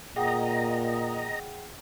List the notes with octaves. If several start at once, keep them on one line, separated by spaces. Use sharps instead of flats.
A#2 G#4 D#5 F#5 G5 A#5